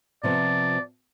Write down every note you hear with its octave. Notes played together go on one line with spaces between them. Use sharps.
C3 F3 B3 D5